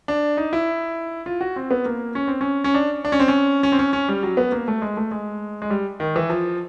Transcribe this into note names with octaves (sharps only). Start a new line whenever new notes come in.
D4
D#4
E4
F4
F#4
C4
B3
A#3
C#4
C4
C#4
C#4
D4
D4
C#4
C4
C#4
C#4
C4
C#4
C#4
G3
F#3
B3
A#3
A3
G#3
A3
G#3
G#3
G3
D#3
E3
F3